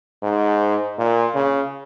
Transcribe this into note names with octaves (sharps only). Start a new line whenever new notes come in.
G#2
A#2
C#3